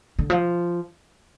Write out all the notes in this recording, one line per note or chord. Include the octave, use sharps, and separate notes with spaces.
D3
F3